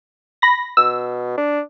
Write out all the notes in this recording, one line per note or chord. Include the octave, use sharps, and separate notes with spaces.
B5 A#6
B2 E6
D4